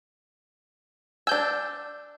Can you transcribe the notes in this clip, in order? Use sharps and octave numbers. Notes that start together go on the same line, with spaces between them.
D4 G#5 E6 G6